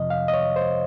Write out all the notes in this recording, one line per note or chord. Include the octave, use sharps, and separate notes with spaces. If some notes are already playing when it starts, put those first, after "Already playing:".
Already playing: F2 C3 F3 D#5
F5
D#5
C#5
C5